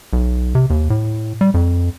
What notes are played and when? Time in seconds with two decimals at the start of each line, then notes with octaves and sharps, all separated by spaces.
0.13 B1
0.55 C3
0.70 D#2
0.90 A2
1.41 G3
1.54 F2